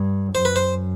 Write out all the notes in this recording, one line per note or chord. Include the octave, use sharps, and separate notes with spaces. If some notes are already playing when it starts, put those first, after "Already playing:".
Already playing: G2
F#2 C5
B4
C5